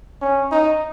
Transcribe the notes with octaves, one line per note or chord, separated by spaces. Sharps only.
C#4
D#4